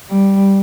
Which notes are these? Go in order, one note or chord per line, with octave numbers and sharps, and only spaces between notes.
G3